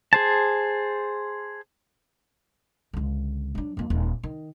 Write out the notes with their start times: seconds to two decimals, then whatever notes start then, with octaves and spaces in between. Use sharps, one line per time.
0.13 G#4 C5 A5
2.93 C#2 D3
3.55 F#3 D4
3.77 F2 A#3
3.90 D#1
4.23 D#3